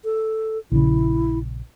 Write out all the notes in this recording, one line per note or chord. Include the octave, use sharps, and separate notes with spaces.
A4
A#1 C#3 E4